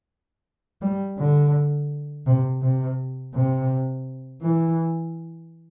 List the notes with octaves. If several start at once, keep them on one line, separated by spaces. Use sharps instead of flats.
G3
D3
C3
C3
C3
E3